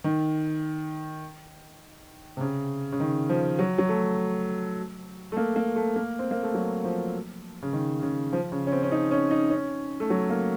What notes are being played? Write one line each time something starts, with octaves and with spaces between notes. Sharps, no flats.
D#3
C3
C#3
C#3
D#3
F3
F#3
F#3
A3
A3
A#3
A#3
A3
A#3
C4
A#3
A3
F#3
F3
C#3
D#3
C#3
F3
C#3
C#4
C4
C#4
D#4
C#4
D#4
C#4
A3
F#3
A#3